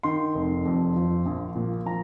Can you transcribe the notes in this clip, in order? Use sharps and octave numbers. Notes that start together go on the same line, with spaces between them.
D#3 C6
F1
F2
F3
A#1
A#2
F3 A#5